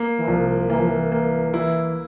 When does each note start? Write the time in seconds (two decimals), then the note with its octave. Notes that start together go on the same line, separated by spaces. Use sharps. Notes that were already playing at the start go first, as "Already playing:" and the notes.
Already playing: A#3
0.18 E3
0.27 C2 F3
0.70 E3 A#3
0.79 F3
0.88 E3
1.12 A#3
1.54 E3 E4